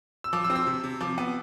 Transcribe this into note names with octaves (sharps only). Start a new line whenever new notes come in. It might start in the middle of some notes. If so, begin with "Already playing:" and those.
E6
F3 D6
E6
C4
E6
C3
C3
F3 D6
B3